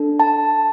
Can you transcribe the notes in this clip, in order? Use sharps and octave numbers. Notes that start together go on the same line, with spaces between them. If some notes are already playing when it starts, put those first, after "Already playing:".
Already playing: D4 A4
A5